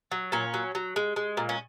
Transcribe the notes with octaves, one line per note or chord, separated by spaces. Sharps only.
F#3
A#2 C#4
F#3
F#3
G#3
G#3
A#2
C#4